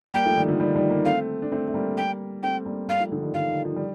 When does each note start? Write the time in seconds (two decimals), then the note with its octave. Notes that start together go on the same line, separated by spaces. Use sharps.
0.14 G3 A#3 G5
0.26 F3 A3
0.37 D#3 G3
0.48 D3 F3
0.60 D#3 G3
0.75 D#3 G3
0.90 G3 A#3
1.05 A3 C4 F5
1.42 D4
1.52 A3 C4
1.68 A3
1.74 G3 A#3
1.97 G5
2.43 A3 C4 G5
2.66 G3 A#3
2.88 G3 A#3 F5
3.00 F3 A3
3.12 D3 F3
3.23 D#3 G3
3.34 D3 F3 F5
3.50 D#3
3.65 F3
3.76 G3